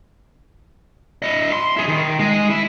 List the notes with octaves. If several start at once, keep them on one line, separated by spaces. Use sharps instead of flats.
E4 D#5
C6
E4 G#4
D#3
G#3 D#5
E4